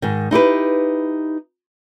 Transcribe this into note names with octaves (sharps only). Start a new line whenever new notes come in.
G#2 D#3
D#4 E4 G4 B4